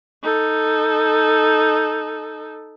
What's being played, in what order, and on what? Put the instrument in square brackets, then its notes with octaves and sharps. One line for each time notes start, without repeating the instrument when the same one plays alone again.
[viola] D#4 A4